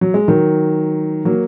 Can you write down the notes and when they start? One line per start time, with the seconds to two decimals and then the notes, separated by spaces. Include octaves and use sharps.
0.01 F#3
0.14 G#3
0.28 D#3 F#3
1.25 F#3 A#3